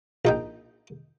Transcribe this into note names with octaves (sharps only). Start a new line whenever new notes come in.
A#1 D#4 G5